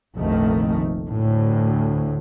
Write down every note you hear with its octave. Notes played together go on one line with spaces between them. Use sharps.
F1 A#1 D#3 A3
D2 A2